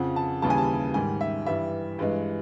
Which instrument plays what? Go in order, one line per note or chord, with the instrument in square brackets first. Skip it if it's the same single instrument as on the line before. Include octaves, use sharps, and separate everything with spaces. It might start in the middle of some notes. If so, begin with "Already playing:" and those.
Already playing: [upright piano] F2 C#3 F3 F#5
A5
D#2 C#3 E3 G3 A5
G#5
A5
G#2 D#3 G3 G#5
E5
G2 E3 G3 E5
G2 E3 G#3 B4